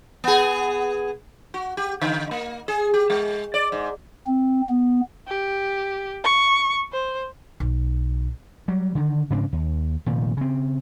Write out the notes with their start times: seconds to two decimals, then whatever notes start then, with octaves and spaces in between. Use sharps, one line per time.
0.24 B3 G#4
1.54 F#4
1.77 G4
2.01 D3
2.31 A#3
2.68 G#4
2.94 G4
3.10 G#3
3.54 D5
3.72 G#2
4.27 C4
4.69 B3
5.28 G4
6.24 C#6
6.92 C5
7.60 B1
8.68 F#3 G3
8.95 D3 D#3
9.30 G#2 C#3 C4 D4
9.53 D#2
10.06 F1 A#2 D#3
10.37 C#3 C4